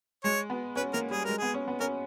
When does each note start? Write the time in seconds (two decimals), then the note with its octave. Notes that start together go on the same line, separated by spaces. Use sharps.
0.24 G#3 C#5
0.50 B3
0.76 C#4 B4
0.93 A#3 A#4
1.11 G3 G#4
1.25 G#3 A#4
1.39 B3 G#4
1.54 C#4
1.68 B3
1.80 C#4 A#4